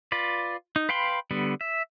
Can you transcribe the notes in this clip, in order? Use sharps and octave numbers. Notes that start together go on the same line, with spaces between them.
F4 B4 D5
D#4
B4 F5 G5 B5 C6
D3 G3 B3
E5